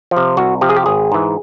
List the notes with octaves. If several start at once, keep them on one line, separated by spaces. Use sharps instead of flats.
F3
C3
C2 F#4
C3 F3 G4
G#4
G4
G#1 G#4
G#2 E3